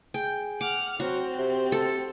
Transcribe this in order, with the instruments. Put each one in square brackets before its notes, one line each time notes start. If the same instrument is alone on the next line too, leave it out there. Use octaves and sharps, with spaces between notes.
[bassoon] G#4 [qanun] G5
[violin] F#5 F6 [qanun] D6
[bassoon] F#3 [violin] C4 [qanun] F#4
[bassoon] C3
[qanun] A4